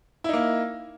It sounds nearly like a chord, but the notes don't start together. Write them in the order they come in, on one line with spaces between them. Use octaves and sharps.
E4 D#4 A#3